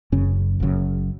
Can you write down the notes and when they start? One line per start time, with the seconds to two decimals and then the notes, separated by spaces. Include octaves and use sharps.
0.12 F#1 F#2 C#3 C#4
0.60 F#1 F#2 C#3